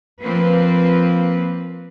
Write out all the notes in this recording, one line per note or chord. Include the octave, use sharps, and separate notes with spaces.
F3 A#3 C4 B4